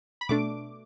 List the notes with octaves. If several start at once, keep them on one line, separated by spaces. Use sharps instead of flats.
B5
B2 A3 D4 D6